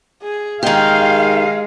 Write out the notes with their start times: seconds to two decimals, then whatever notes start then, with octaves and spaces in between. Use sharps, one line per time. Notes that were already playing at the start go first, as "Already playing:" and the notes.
0.22 G#4
0.63 D#3 G#3 G4 F5